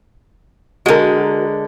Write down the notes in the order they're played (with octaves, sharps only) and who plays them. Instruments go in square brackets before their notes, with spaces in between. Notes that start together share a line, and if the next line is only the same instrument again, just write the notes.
[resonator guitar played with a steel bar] D3 G#3 [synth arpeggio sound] F#4 A#4